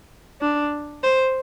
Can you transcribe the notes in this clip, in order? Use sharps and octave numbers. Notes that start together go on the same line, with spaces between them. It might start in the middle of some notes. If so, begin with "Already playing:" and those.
D4
C5